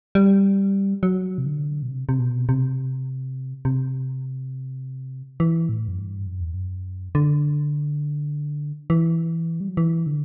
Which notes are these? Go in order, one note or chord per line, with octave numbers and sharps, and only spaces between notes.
G3
F#3
C3
D3
B2
C3
C3
B2
C3
C3
E3
A2
F#2
G2
F#2
E2
F#2
D3
E3
G3
F#3
E3
D3